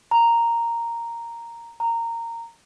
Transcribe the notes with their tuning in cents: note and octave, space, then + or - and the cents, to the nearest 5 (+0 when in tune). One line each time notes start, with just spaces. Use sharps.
A#5 -5
A#5 -15